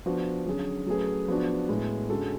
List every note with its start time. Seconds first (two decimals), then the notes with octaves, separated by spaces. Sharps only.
0.06 F3 B3 D4 F#4 B4
0.46 D3 F#3 C#4 G#4
0.87 F#3 A3 C#4 G#4 B4
1.28 F3 B3 D4 F#4
1.69 A2 G#3 B3
2.09 D3 G#3 C#4 F#4 A4